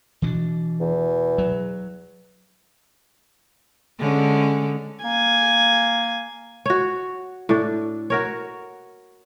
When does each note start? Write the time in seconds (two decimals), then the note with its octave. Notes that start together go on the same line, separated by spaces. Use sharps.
0.22 B2 E3 C4 D4
0.80 E2
1.38 F#3
3.99 D3 G#3 C#4
5.04 A#3 G#5
6.66 F#4 C#5
7.49 A2 D4
8.10 F#4 A#4 C#5